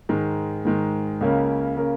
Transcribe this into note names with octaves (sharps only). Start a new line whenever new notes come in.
G#2 D#3 G#3
G#2 D#3 G#3
C#2 C#3 A#3 C#4 A#4
C#3 A#3 C#4 A#4